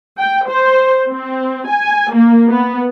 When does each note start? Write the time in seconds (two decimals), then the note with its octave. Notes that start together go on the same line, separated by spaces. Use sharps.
0.19 G5
0.48 C5
1.10 C4
1.69 G#5
2.13 A#3
2.49 B3